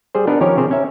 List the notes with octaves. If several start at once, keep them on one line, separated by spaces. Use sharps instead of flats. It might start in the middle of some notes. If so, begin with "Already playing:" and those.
G3 G#4 C5
B3 D4 D#4 A#4 B4
D#3 F3 C#4 G4 A#4 C#5
C3 G#4 A#4 C5
C#4 E5